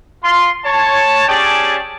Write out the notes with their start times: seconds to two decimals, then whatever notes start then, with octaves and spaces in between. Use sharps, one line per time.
0.24 F4 C6
0.65 C#5 A5
1.28 C#4 G4 G#4 D5 G5 A5